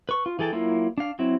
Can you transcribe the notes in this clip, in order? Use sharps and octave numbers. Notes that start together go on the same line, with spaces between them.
B4 C#6
F4
E3 G#4 A4 G5 A5
F#3 A#3 E4 F4
D4 F5
F#3 C4 E4